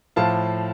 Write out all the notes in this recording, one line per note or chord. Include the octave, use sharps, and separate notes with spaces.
A2 F3 F5 A5